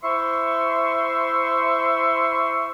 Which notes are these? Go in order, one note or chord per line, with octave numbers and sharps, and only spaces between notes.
E4 C5 E5 C6 C#6